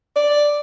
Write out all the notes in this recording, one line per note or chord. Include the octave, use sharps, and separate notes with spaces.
D5